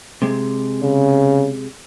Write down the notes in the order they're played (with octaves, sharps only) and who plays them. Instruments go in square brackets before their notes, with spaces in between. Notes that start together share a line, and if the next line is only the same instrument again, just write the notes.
[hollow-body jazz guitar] C3 G#3
[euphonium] C#3